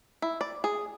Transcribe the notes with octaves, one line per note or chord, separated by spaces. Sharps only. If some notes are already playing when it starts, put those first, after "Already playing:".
E4
D5
G#4